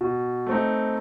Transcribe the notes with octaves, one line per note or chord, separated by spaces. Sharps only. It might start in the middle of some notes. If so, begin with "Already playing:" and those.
B2
A3 C4 D#4